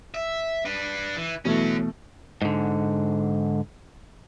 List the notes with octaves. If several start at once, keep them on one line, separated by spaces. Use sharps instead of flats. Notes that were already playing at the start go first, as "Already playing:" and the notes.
E5
D4 B4
E3
B2 E3 F#3 A3 C#4
G#2 D3